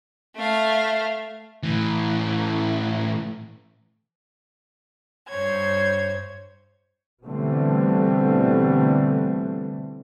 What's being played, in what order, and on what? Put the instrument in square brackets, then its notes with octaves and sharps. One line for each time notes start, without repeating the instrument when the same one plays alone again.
[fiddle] A3 F5
[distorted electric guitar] A2 E3
[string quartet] G2 C5 C#5 G#6
[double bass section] B2 D3 E3 G3 A3 C4